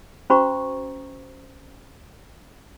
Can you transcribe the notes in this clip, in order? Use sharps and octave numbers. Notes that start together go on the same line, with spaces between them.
C#4 F#4 C5 A#5 C#6